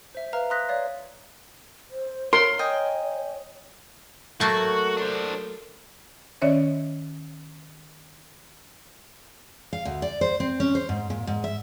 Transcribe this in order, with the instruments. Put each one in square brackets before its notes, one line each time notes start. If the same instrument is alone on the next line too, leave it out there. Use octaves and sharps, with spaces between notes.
[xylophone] C5 E5
B4 E5 F5 A#5 F6
A#5 C6 D#6 F#6 A#6 B6
C#5 D5 F5
[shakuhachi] C5
[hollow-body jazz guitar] A#4 [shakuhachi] C#5 [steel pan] C6
[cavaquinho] D#5 G5 G#5
[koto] F#3 A3 A#3 [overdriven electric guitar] F#4
[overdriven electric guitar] D4 C5
[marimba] D#3 C#4 C#5 D5 E5
[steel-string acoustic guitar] F5
D2
D5
C5
C4
C#4
C5
G#2
A#2
G#2
E5